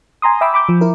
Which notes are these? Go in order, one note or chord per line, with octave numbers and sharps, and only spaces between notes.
G#5 A#5 C6 D#6
E5 G5 B5 D6 E6
B5 D6 G6
F3
E4 A#4